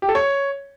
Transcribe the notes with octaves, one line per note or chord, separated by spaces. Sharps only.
G4
A4
C#5